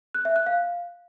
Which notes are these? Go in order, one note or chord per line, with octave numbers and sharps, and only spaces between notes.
F#6
E5
F#6
F5